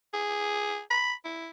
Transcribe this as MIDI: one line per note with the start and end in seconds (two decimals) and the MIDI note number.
0.14 0.80 68
0.90 1.13 83
1.25 1.50 64